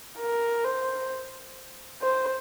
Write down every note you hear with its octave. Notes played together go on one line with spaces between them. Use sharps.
A#4
C5
C5